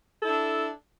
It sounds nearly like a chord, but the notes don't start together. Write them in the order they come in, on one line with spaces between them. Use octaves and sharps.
A4 E4 D4